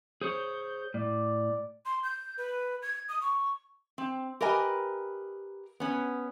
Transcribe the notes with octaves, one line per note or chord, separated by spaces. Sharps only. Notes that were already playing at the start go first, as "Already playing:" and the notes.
G#4 C5 C#5 G6
A2 D5
C6
G6
B4
G#6
D#6
C#6
C4
G4 A#4 B4 D#5 G#5
B3 C#4